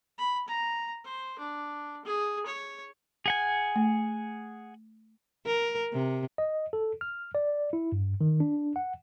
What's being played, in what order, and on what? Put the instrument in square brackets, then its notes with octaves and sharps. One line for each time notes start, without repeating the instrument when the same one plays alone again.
[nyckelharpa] B5
A#5
C5
D4
G#4
C#5
[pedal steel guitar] G#4 F#5 G#5
[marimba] A3
[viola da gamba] A#4
C3
[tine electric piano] D#5
A4
F6
D5
E4
G2
D#3
D4
F#5